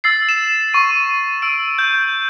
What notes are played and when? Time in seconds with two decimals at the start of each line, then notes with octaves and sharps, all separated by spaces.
0.04 E6 A6 C7
0.29 E7
0.74 C#6 D#7
1.42 E6 D7
1.79 G6